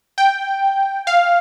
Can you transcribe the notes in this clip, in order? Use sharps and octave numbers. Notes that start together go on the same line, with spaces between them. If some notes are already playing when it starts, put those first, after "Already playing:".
G5
F5